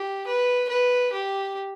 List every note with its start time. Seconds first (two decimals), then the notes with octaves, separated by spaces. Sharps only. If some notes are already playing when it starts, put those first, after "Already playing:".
Already playing: G4
0.27 B4
0.69 B4
1.13 G4